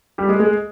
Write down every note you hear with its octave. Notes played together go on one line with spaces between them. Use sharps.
G3 G4
G#3 G#4
G#3 G#4